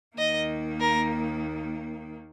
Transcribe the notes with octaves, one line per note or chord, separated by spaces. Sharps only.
D#2 D#3 A#3 D#5
A#4